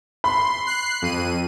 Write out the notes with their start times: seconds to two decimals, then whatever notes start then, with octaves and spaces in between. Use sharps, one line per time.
0.24 B5 C6
0.66 F#6 C7
1.02 F2 D#7